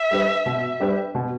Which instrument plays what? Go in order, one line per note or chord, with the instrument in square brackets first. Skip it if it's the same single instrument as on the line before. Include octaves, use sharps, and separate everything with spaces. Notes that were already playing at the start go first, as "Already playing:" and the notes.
Already playing: [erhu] E5
[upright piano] G3 D4 G4 B4
B2
G3 D4 G4 B4
B2